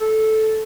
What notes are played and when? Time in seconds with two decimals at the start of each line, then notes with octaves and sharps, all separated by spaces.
0.01 A4